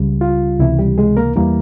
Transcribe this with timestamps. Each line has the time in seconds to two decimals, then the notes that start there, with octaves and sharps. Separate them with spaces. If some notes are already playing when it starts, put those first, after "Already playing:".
Already playing: C#2 C#3 G3
0.21 F4
0.60 C#2 C3 E3 E4
0.79 G3 G4
0.98 G#3 G#4
1.17 A#3 A#4
1.36 E2 E3 G3 A#3 A#4